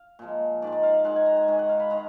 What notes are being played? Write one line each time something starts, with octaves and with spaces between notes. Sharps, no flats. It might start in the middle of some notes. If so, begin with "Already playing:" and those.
Already playing: F5
A#2 F3 G#3
G#2 D#3 G#3 D5
D5
F5
F5
G#2 D#3 G#3 F#5
G#5
A#5
G#5
G#2 D#3 G#3 G#5
F#5
F5
B5
D#3 G#3 A#5